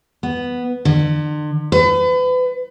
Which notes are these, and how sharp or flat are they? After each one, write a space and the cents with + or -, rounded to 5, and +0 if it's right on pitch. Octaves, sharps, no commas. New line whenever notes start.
B3 +0
D3 +40
B4 +35